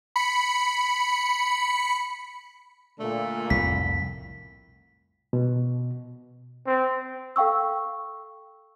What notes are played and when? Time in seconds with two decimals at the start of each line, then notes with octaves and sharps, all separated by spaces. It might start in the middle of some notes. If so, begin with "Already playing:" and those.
0.16 B5 C#7
2.99 A#2 D3 A3
3.50 C2 F2 A2 B6
5.33 B2
6.66 C4
7.36 A4 F5 G5 C#6 E6